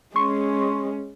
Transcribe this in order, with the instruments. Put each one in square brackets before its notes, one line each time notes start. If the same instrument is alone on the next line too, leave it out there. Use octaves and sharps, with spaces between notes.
[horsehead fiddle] G#3 C#4 [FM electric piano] C6 C#6